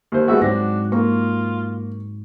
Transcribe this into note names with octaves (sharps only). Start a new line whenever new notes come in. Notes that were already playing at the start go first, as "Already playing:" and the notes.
D#2 C5
G3 G#3 B3 F#4 E5
G#2 F#3 C4 D4 F#5 A#6
A#3 F4 C#6